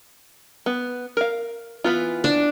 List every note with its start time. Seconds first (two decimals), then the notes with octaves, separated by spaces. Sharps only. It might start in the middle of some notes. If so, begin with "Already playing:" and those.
0.66 B3
1.17 A#4 F5
1.84 E3 B3 F4
2.24 D4